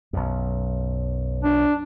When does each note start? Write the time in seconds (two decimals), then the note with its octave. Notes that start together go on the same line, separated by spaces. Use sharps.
0.13 B1 F#2
1.44 D4